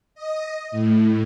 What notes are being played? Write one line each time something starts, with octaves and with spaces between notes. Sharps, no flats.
D#5
A2